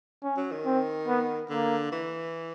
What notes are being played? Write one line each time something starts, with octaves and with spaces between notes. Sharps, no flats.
C#4
F#3
D#3
C4
B3
D3 A#3
E3